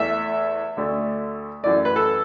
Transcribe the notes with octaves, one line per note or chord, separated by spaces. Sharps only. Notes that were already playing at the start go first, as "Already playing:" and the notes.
Already playing: E2 E3 A3 E5
D2 D3 A3
F#2 E3 A3 D5
B4
A4